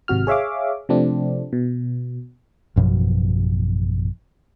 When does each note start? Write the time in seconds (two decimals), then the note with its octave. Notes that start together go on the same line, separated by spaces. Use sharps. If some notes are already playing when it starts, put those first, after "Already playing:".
0.08 G#1 C3 F#4 F6
0.27 G#4 C#5 E5 F5 D6
0.89 C3 F3 A3 C4 D4
1.53 B2
2.76 A1 F#2 B2 F3